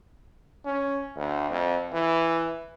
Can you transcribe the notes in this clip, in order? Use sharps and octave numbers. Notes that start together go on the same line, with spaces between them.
C#4
D2
F2
E3